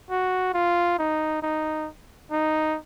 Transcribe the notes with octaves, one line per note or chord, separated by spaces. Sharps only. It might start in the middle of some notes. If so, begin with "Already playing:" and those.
F#4
F4
D#4
D#4
D#4